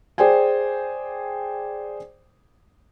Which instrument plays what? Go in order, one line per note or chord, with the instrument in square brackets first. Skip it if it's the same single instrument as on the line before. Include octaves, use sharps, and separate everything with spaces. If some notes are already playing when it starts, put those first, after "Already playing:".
[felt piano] G#4 C5 D5 G5 G#5